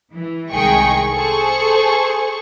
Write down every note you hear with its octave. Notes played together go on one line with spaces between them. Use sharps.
E3
C2 D#3 G#3 G#4 G5 C#6
G#4 A4 C5 C#6